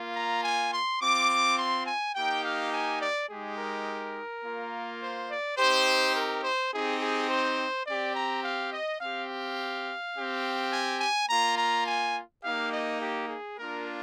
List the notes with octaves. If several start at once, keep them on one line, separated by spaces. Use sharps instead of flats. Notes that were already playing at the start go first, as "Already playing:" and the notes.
Already playing: A#3 F4
A#5
G#5
C6
C4 F4 D6
C6
G#5
A#3 D#4 G4 G5
F5
G#5
D5
G#3 D#4 G4 G#4
A#4
A#3 F4
C5
D5
C4 D#4 G4 C5
A#4
C5
C4 D#4 G4 G#4
G#4
C5
C4 G4 D5
A#5
F5
D#5
C4 G4 F5
F5
C4 G4
G#5
G#5
A#3 F4 A#5
A#5
G#5
A#3 D#4 G4 F5
D#5
G4
G#4
A#3 D4 F4 A#4